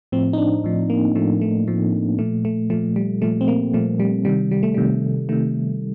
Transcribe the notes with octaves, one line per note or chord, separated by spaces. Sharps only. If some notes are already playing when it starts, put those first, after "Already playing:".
A2 F3 C4
D#4
D4
A2 F3
A#3
A2 F3 A3
A3
A2 F3
A#2 F3 A3
A3
A#2 F3 A3
G3
A#2 F3 A3
C4
A#3
A#2 F3 A3
G3
C3 D#3 G3
G3
A3
C3 D#3 G3
C3 D#3 A3